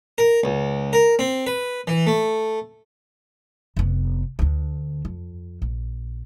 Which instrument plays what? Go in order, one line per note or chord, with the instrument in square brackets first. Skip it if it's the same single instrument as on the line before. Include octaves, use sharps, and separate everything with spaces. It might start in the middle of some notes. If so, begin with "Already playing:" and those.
[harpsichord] A#4
C#2
A#4
C4
B4
E3
A3
[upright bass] F1 B3
D2 D4
F2
A#1